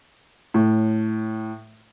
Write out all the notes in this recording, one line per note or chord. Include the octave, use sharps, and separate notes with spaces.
A2